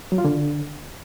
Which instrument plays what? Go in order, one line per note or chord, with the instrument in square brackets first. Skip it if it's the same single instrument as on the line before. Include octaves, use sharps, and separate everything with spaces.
[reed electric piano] F#3
F4
D3